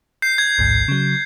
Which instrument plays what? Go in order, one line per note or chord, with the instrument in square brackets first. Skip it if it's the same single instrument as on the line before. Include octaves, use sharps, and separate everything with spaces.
[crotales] G6 C7
G#6
[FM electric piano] A1 D2 G#2
C#3 F#3